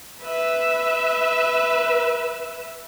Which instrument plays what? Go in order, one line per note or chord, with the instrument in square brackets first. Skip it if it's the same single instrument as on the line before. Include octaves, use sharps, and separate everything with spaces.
[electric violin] B4 E5